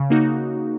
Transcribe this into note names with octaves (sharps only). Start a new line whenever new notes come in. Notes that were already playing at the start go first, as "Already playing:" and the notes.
Already playing: C#3
A#3 D#4 F#4